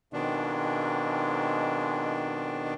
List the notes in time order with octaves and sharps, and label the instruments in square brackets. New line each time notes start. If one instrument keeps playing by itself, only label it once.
[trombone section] F2 G#2 G#3 [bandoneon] B2 D#3 D4